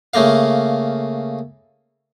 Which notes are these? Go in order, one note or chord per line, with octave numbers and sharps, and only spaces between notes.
C#3 A3 A#3 F5